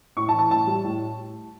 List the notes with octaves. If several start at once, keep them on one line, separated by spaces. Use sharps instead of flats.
A2 C#6
A5
E3
A5
A2 A5
G3
A2